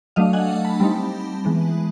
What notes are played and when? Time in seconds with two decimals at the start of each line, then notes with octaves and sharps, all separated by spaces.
0.16 F#3 A3 D4 D#5 F5
0.33 F#5 G#5
0.65 A5 B5
0.80 G3 C4 D#4 A5 B5
1.45 E3 G#3 B3